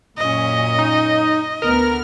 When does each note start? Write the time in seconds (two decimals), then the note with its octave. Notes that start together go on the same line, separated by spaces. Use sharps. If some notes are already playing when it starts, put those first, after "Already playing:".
0.18 F#2 A#2 C#4 D#5
0.79 D#4
1.62 D2 B3 A#4 F6